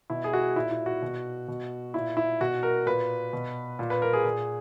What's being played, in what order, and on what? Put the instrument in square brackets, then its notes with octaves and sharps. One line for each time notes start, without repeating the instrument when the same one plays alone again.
[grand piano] B2 E4
G#4
F#4
A#2 E4
E4
F#4
B2
B2
A#2 E4
E4
B2 F#4
A#4
A#2 B4
B2
A#2
B4
A#4
G#4
A#2 G#4